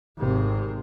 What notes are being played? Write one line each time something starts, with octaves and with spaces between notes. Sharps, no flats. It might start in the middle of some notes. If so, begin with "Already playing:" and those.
G#1 C3